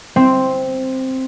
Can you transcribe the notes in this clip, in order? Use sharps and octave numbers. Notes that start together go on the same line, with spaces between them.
C4